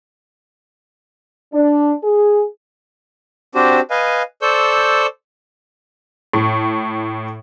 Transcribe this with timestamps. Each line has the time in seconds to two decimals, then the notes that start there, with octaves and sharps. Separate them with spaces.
1.54 D4
2.04 G#4
3.55 C4 D4 F#4 G4 C5
3.90 B4 D#5 F5 G#5
4.42 A4 C5 D5 C#6 E6 G6
6.33 A2